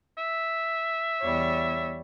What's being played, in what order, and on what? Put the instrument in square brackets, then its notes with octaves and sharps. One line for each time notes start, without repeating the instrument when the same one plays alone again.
[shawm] E5
[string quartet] E2 G3 C#5